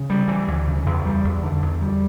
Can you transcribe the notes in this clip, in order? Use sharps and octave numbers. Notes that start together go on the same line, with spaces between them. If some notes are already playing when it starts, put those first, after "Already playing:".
Already playing: C#3
G3
E3
D2
C#3
E2
G3
E2
D3
E2
G3